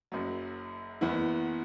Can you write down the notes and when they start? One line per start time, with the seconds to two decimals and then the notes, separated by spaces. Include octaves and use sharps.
0.12 F#1 F#2 F#3
1.01 F#1 E2 E3 B3 E4